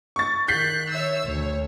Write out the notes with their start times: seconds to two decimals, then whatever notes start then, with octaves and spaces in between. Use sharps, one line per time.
0.16 C#6 A6
0.48 D#3 F#6 G6 B6 C7
0.91 C#5 E5 E6
1.25 D2 C#5